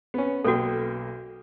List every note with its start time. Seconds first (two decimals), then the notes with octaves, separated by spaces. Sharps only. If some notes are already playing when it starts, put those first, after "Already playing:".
0.14 B3 C#4
0.45 B1 A#3 F#4 A4 G5